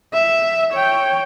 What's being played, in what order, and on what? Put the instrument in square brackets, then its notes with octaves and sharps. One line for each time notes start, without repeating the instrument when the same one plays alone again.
[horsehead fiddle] E5
C#5 G5